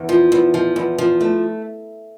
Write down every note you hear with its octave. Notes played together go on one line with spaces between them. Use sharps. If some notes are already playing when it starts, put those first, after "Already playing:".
Already playing: E2
F3
E2
F3
E2
F3
A3